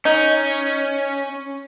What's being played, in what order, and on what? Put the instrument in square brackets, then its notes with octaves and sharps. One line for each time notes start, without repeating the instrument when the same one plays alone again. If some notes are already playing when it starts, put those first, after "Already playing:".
[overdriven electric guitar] C#4 [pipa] D#4